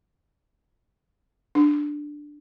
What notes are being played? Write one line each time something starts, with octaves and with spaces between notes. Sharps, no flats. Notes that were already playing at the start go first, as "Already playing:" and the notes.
D4